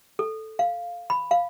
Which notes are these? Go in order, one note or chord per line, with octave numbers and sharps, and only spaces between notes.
A4
F5
B5
F5